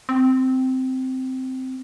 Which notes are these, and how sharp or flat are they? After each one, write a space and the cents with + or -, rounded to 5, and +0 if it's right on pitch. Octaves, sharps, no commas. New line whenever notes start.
C4 -10